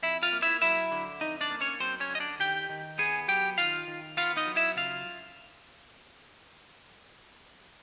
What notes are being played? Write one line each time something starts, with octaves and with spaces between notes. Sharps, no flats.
F2 E4 E5
F4 F5
A#3
E4 E5
F#3 E4 E5
D3
F2 D#4 D#5
D4 D5
A#3
C#4 C#5
F#3 C4 C5
C#4 C#5
D3
D#5
D4 D5
D#3 G4 G5
D#3
B3 G#4 G#5
F#3 G4 G5
D#3 F4 F5
D#3
B3 F4 F5
D#4 D#5
F#3
E4 E5
C#3 F4 F5